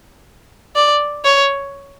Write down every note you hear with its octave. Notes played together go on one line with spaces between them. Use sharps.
D5
C#5